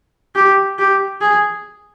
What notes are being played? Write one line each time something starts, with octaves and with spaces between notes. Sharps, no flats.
G4
G4
G#4